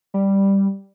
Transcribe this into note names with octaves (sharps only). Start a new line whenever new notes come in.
G3